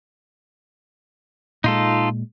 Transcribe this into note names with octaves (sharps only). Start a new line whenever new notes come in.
A#2 G#3 D#4 F4 A4